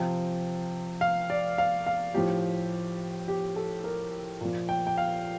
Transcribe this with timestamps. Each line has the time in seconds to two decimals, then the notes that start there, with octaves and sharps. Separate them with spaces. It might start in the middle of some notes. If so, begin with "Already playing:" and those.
Already playing: C3 F3 G5
1.01 F5
1.30 D5
1.58 F5
1.86 F5
2.14 A2 F3 G4
3.28 G4
3.56 A4
3.84 A#4
4.41 A#2 F3
4.69 G5
4.87 G5
4.98 F5